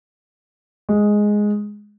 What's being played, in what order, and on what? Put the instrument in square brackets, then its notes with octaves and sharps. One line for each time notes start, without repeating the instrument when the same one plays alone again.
[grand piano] G#3